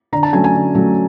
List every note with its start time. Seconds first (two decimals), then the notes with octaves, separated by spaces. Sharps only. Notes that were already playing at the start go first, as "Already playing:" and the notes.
0.12 D3 A#5
0.23 A5
0.33 F#3 A3 C#4 G#5
0.44 G#5
0.54 D3
0.75 F#3 A3 C#4